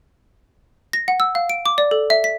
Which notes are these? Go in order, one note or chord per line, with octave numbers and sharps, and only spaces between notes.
A#6
F#5
E6
F5
D7
D6
D5
A4
E5
B6